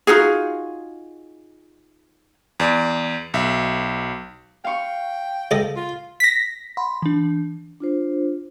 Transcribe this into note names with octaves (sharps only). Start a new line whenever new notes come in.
D#4 F4 F#4 G#4
E2 D5
B1 E5
F5 G5 C#6
C#2 A4 D#5
F4
A#6 B6
F#5 B5 C6
E3 D4
D4 F4 C5